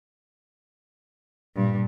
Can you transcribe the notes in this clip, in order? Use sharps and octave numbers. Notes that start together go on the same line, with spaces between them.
G2 A#2